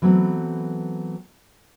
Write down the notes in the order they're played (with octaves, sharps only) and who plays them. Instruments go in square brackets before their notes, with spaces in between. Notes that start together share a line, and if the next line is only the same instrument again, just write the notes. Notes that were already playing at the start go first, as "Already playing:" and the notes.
[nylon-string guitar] E3 F#3 A3 B3 C4